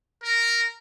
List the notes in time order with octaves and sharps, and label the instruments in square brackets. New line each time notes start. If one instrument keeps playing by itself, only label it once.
[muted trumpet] A#4